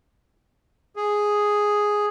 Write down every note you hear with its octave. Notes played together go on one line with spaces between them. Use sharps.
G#4